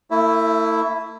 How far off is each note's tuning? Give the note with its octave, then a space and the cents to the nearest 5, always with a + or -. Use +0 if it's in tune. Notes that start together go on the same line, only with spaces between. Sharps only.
A3 +40 E4 +0